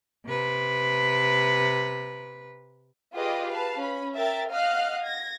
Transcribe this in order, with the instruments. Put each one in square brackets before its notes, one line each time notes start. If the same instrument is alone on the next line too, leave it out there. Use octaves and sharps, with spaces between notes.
[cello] C3 B4
[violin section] F4 G4 G#4 B4 D5 D#5
B4 F5 A5
C#4 B5
A#4 E5 G5 A6
D#5 F5 F#5 F6 F#6
G#6 A#6